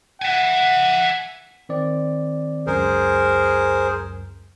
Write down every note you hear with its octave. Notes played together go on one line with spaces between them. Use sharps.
E5 F#5 G#5
D#3 C4 D5
C#2 F#2 G#4 A#4 C5